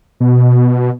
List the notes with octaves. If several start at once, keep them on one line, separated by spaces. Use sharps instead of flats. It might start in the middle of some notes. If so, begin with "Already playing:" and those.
B2